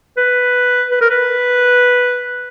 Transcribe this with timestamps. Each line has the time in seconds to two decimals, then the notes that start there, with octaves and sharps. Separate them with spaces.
0.18 B4
0.91 B4
1.01 A#4
1.11 B4